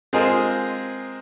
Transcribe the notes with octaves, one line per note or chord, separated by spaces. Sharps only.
G#3 C4 F4 G#4 A#4 D#5